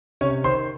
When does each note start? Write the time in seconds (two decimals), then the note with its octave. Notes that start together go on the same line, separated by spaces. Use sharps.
0.21 C3 C#4 C#5
0.44 D#3 C5 C6